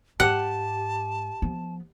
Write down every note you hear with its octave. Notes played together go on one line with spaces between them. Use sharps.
G#2 G4 F#5 A5
F3 B3